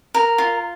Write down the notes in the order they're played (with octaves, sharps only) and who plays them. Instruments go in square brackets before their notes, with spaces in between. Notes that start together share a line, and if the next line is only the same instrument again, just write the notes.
[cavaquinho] A#4
F4